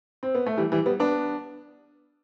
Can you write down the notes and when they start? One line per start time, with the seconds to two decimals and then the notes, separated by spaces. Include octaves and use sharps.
0.23 C4
0.35 B3
0.46 A3
0.57 E3 G3
0.72 E3 G3
0.86 G3 B3
1.00 B3 D4